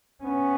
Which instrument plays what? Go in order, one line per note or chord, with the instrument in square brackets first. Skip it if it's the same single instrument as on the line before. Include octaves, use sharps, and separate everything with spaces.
[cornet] B3 [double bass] C#4